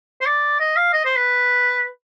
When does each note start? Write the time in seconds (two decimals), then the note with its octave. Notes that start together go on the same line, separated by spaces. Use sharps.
0.21 C5
0.26 D5
0.60 D#5
0.76 F5
0.93 D#5
1.05 C5
1.16 B4